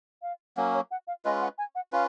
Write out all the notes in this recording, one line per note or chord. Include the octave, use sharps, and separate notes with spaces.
F5
F#3 A#3 C#4 F#5
C#5
F#5
F5
G#3 C#4 F4 B4 D#5
F#5
G#5
F#5
C#4 F4 B4 F5